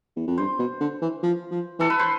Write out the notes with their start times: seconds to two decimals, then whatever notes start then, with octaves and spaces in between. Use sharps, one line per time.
0.16 E2
0.28 F2
0.38 G2 C5
0.59 B2
0.80 D3
1.02 E3
1.23 F3
1.51 F3
1.79 E3 A4
1.90 B4
2.00 C5